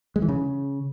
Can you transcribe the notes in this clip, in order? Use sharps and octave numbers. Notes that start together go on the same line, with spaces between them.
G#3
E3
C#3